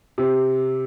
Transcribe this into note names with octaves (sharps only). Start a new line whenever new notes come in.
C3